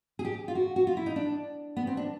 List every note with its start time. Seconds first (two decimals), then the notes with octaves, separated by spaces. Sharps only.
0.19 G#4
0.25 G4
0.48 F4
0.55 F#4
0.76 F#4
0.87 F4
0.97 E4
1.06 D#4
1.16 D4
1.77 B3
1.87 C4
1.97 D4